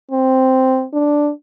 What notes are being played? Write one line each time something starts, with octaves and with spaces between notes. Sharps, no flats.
C4
D4